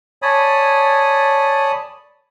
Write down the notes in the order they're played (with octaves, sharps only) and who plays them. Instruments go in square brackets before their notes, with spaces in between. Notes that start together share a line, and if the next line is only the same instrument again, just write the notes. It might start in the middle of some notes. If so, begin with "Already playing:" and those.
[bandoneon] C#5 D5 G#5 A5 B5 D#6